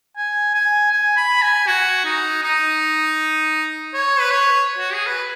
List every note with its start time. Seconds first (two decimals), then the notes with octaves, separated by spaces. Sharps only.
0.17 G#5
0.55 G#5
0.92 G#5
1.17 B5
1.42 G#5
1.67 F#4
2.05 D#4
2.43 D#4
3.93 C#5
4.19 B4
4.31 C#5
4.79 F#4
4.93 G#4
5.07 B4